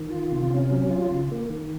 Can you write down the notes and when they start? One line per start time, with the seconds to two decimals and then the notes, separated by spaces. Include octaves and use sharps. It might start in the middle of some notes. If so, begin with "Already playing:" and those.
Already playing: D#3
0.10 F4
0.31 C3
0.50 C#4
0.71 F#3
0.91 F4
1.11 C#3
1.32 A#3
1.50 D#3